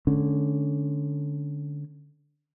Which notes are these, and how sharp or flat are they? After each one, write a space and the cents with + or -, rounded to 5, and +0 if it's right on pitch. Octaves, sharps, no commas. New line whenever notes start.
D3 +0 G#3 +45 C#4 +0